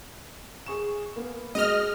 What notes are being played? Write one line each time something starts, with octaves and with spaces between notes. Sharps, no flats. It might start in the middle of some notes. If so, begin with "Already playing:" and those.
G#4 C#6 E7
A#3 B3
G#3 F#4 D#5 F6 F7